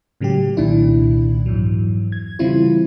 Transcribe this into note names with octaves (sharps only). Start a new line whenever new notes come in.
A2 C#3 F#3 G#3 G4
C2 A#2 D#3 D4 E4
F2 G#2 E3 F#3
G#6
C#3 E3 G3 C4 E4 F4